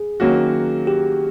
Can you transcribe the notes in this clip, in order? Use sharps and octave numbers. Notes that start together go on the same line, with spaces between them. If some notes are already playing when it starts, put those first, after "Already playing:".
Already playing: G#4
D#3 F#3 A#3 C#4 F#4
G4